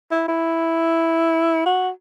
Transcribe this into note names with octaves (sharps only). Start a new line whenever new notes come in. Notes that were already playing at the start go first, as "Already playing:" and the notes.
E4
E4
F#4